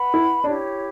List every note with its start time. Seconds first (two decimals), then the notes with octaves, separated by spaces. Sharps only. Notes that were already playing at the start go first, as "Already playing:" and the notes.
Already playing: B4 F#5 B5
0.14 E4
0.43 D4 E4 G4 C#5